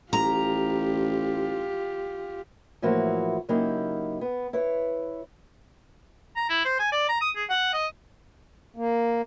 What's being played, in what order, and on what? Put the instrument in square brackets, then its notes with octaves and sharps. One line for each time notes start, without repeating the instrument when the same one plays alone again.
[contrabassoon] A1 [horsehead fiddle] F4 G4 [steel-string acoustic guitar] A#5
[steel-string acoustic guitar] A2 E3 F3 A#3 E4 F#4
C#3 F#3 A#3 D#4 E4 G4
B3
E4 B4 C#5
[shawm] A#5
E4
C5
G#5
D5
A#5
D#6
G#4
F#5
D#5
[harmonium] A#3